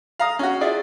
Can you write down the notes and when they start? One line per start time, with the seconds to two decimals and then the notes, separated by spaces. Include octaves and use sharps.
0.19 F5 A#5 D#6
0.39 C#4 F#4
0.61 E4 F4 G#4 D5